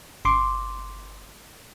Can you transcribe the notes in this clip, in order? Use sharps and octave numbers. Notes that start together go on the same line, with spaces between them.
G1 C6 D6